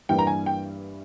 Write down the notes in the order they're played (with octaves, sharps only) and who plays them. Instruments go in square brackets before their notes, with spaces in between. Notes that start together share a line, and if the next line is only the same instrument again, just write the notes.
[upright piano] G2 E3 G3 A#3 G5
A#5
G#5
G5